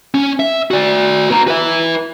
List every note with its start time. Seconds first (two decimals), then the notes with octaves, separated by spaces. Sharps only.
0.14 C#4
0.40 E5
0.71 F#4 D5
1.30 B3 A#5
1.48 B4 E5